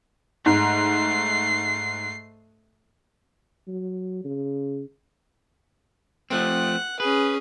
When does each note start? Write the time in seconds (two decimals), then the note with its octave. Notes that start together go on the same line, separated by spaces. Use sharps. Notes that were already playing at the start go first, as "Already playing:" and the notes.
0.46 G#2 A3 C7
3.67 F#3
4.24 C#3
6.30 F3 A3 C4 F#5
7.00 C#4 G#4 B4